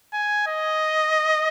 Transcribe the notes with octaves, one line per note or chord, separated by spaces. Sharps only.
G#5
D#5